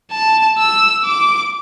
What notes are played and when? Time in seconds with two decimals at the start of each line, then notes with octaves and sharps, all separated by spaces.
0.11 A5
0.59 E6
1.05 D6